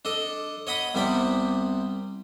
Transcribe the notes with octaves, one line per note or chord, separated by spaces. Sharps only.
D4 A4 D#5
C#5 D#5 F#5 B5 D#6
C2 C3 G3 B3 D5 B5